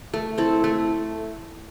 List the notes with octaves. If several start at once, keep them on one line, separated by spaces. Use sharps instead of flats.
A3
C4 E4 A4
A3